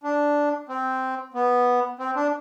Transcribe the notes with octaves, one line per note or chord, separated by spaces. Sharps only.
D4
C4
B3
C4
D4